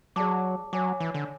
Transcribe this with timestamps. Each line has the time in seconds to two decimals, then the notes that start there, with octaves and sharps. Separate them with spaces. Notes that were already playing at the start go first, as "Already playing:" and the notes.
0.16 F#3 G#4 D5 A5 D6
0.73 F#3 C#5 G#5 D6
1.00 E3
1.14 D3